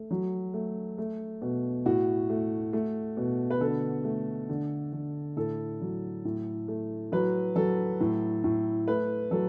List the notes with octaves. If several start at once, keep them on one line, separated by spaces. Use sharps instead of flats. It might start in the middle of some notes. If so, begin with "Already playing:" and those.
Already playing: A3
F#3
A3
A3
B2
A2 F#4
A3
A3
B2
B4
D3 A4
A3
D3
D3
A2 A4
F#3
A2
A3
F#3 B4
F#3 A4
A2
A2
A3 B4
F#3 A4